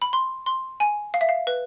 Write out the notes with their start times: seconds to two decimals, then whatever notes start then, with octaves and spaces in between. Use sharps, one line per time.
0.02 B5
0.13 C6
0.46 C6
0.80 G#5
1.14 F5
1.21 E5
1.29 F5
1.47 B4